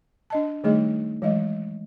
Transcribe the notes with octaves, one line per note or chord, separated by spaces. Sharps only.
D4 D#5 A5
D#3 G3 A3 D#4 G#4 D#5
E3 F#3 G#3 D#5